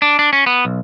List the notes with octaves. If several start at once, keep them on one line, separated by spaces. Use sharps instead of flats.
D4
D4
C#4
B3
B1